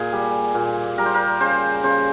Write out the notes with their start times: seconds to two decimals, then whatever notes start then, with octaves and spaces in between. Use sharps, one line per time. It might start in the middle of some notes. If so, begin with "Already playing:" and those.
Already playing: A#2 G#4
0.12 G3
0.54 A#2
0.98 G3 A#4
1.06 C5
1.14 A#4
1.40 C#3 C5
1.84 C#3 C5